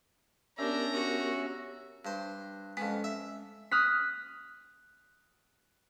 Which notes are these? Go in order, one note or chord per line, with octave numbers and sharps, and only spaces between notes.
B3 C#4 D4 G4 A#4 E5 A#5
F#4
G2 C5
F2 G#3 B3 C#4
E5
D#6 F6 F#6 B6